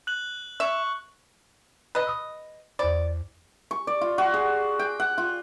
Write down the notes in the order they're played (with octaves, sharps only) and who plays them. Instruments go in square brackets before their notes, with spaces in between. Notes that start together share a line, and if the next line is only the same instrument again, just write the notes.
[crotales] F#6 F#7
[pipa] E5 [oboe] C#6
[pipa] B4 D#5
[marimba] D#6 E6
[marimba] E2 C5 B5 [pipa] D5
[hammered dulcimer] C#6
D5
F4
F#4
G#4
G5
F#5
F4